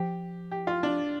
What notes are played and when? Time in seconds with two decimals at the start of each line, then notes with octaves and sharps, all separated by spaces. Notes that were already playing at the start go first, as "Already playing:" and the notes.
Already playing: F3 G4
0.51 G4
0.67 F4
0.83 D4